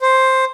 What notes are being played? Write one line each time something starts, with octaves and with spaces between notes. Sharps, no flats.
C5